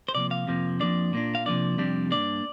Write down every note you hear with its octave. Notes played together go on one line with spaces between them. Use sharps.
C5
C3 F3 A#3 D5
F5
F2 C3 F3 A#3
F2 F3 A#3 D4 D5
A#2 A#3 D4
F5
C3 F3 A#3 D4 D5
F2 C3 G3 D4
G2 D3 A#3 D4 D5